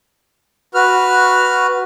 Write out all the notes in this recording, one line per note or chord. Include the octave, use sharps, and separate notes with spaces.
F#4 B4 F6